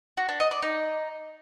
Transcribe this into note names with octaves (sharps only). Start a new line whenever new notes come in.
F#4
D4
D#5
D5
D#4